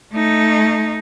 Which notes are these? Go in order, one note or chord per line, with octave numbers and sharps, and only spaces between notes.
A3 D#4